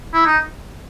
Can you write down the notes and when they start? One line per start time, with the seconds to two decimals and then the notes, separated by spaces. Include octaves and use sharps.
0.14 E4
0.26 D#4